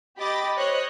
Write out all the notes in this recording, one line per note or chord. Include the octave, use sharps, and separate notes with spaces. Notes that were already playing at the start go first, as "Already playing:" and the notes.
G4 D#5 B5 D6 A6
C5 C#5 D#5 F#6